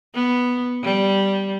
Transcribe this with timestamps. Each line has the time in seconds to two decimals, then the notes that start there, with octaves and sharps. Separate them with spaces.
0.14 B3
0.83 G3